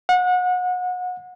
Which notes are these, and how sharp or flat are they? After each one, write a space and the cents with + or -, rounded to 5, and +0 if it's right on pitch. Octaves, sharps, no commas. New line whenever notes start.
F#5 -30